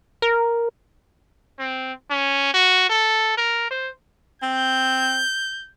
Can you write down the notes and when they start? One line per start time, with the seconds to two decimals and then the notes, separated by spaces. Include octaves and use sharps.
0.22 A#4
1.59 C4
2.11 C#4
2.54 F#4
2.89 A4
3.37 A#4
3.71 C5
4.42 C4 G6